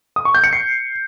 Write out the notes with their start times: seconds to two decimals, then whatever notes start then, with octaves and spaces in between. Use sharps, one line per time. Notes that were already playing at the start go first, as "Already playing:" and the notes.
0.16 D#6
0.25 C#6
0.34 G6
0.44 C#7
0.53 C7